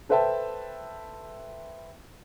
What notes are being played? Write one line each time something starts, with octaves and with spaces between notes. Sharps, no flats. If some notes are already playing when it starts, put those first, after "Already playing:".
A4 B4 C5 E5 G5 A5